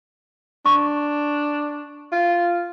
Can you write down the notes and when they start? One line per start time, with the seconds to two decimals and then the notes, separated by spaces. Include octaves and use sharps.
0.66 D4 C#6
2.12 F4